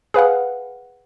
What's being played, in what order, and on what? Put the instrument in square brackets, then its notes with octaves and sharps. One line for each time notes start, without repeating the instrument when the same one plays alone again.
[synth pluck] G#4 B4 F5 F#5